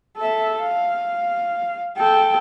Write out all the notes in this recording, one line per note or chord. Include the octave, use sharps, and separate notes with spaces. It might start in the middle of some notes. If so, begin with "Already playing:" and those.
A4 E5
F5
A4 G5